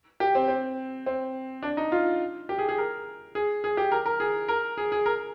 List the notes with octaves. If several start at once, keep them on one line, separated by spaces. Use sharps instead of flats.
G4
C4
C4
C4
D4
D#4
F4
G4
G#4
G#4
A#4
G#4
G#4
G4
A#4
A#4
G#4
A#4
G#4
G#4
A#4